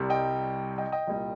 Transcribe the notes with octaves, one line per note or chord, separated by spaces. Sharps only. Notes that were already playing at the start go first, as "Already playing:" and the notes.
Already playing: C2 C3 G3
D#5 G5
D#5 G5
D#5 G5
C2 A#2 G3